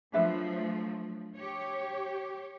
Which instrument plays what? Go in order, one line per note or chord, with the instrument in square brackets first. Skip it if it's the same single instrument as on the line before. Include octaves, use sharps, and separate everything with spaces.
[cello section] F3 F#3 A3 [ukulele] D4 B4 E5
[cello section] G4 C#5